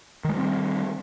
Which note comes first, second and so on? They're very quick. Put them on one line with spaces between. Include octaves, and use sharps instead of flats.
D#3 G#3 G3 C4